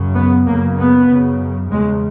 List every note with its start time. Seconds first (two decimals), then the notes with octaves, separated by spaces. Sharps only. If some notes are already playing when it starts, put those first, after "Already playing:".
Already playing: F#2 C#3
0.16 B3
0.47 F#2 C#3 A#3
0.79 B3
1.09 F#2 C#3
1.72 E2 C#3 G#3